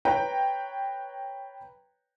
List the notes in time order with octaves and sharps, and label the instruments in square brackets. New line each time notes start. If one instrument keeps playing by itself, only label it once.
[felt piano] B4 C#5 G5 A#5